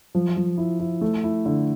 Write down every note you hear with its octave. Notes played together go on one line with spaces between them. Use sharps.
F3
F3
E4
E4
A3
E4
D3